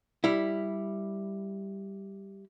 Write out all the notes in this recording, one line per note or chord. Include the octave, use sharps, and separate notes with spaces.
G3 E4